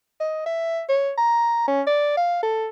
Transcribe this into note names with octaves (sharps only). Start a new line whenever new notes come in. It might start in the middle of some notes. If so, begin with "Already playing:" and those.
D#5
E5
C#5
A#5
C#4
D5
F5
A4